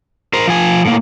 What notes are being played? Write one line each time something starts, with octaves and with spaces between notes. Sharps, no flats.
A#4 C5
F3 G#5
A2 A#3